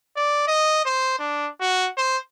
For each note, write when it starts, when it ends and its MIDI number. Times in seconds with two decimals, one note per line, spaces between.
0.17 0.47 74
0.48 0.83 75
0.85 1.16 72
1.19 1.49 62
1.61 1.89 66
1.98 2.18 72